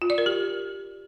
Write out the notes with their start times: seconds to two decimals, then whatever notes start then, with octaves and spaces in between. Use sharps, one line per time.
0.02 F4
0.10 D5
0.18 A#4
0.26 G4